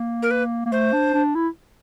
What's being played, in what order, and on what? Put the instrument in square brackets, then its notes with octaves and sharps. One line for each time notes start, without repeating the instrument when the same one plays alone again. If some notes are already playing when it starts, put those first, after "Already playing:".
Already playing: [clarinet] A#3
[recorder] A#4
B4
[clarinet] A#3
[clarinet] A3 [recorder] C5
[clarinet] D4
D4
E4